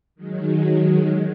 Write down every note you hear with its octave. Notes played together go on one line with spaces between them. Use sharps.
D#3 F#3 G#3